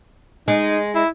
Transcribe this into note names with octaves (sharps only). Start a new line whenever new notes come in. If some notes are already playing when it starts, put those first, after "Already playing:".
G#3 D#4
E4